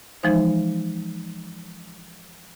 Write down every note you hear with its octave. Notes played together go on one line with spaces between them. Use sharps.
E3 F3 G#3 D#4 C5